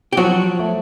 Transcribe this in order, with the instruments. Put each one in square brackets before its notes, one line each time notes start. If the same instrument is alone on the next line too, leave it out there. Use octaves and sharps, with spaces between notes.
[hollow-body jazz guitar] G4
[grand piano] F3 [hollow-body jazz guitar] F#3 F#4
[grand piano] A3